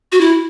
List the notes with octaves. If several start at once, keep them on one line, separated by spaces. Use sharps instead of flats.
F#4
E4